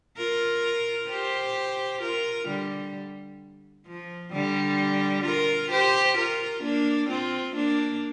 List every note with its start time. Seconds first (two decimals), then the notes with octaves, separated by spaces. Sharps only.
0.17 F4 A#4
1.09 G4 C5
2.02 F4 A#4
2.48 D3 G3
3.86 F3
4.33 D3 G3
5.25 F4 A#4
5.71 G4 C5
6.17 F4 A#4
6.63 A#3 D4
7.10 C4 F4
7.55 A#3 D4